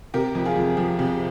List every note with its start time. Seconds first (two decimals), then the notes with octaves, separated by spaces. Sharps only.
0.14 C3 G4 A#4
0.35 F2
0.45 F4 G#4
0.56 F2
0.77 F3
0.99 C3